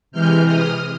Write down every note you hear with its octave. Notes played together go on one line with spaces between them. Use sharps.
C3 E3 G#3 F6 G6
D#6 F6